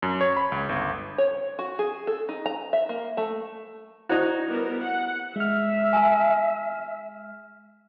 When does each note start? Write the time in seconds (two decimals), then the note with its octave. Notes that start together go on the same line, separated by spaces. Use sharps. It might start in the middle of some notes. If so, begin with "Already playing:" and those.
0.02 F#2
0.21 C#5
0.37 B5
0.52 C#2
0.69 G1
1.18 C#5
1.59 F#4
1.79 G#4
2.07 A4
2.29 D#4
2.46 A#5
2.73 E5
2.89 A#3
3.17 A3
4.09 D#4 E4 F#4 C5 D5
4.47 G3 B3 A#4
4.83 F#5
5.36 G#3 E5 F6
5.93 G#5 A5